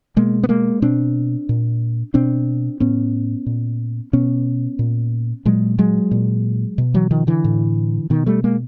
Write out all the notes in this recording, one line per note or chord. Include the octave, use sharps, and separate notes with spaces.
B2 G#3 A#3
B3
G#3 A#3
B2 C4 D4
A#2
B2 C4 D4
A2 B3 C#4
A#2
B2 B3 C#4
A#2
A#2 F#3 G#3
F#3 G#3
A#2
B2
E3 F#3
D#3 F3
D3 E3
A2
B2 D#3
G3 A3
G#3 A#3